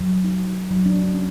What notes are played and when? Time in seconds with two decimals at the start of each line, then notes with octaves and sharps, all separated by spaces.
0.01 F#3
0.24 D#4
0.71 F#3
0.86 D4
1.14 C#4